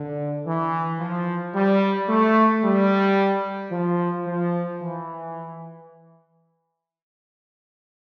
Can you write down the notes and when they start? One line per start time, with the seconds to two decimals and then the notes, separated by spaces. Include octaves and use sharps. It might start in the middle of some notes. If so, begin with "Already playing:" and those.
Already playing: D3
0.46 E3
1.00 F3
1.54 G3
2.09 A3
2.63 G3
3.71 F3
4.26 F3
4.80 E3